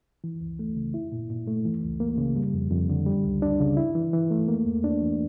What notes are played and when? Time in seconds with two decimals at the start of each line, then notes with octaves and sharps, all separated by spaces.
0.24 E3
0.41 C#2
0.59 A3
0.76 C#3
0.94 E4
1.12 A#2
1.30 A#2
1.47 A3
1.65 E3
1.83 C#2
2.00 A#3
2.18 C#3
2.36 G3
2.54 F2
2.71 F2
2.89 D3
3.06 G3
3.24 C#2
3.42 D4
3.60 C#3
3.77 E4
3.95 E3
4.13 E3
4.31 A3
4.48 A#3
4.66 E2
4.84 D4
5.02 E3